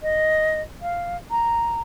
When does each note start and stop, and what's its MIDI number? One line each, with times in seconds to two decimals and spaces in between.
0.03 0.61 75
0.82 1.17 77
1.31 1.81 82